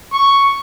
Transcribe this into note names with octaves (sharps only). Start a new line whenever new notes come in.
C#6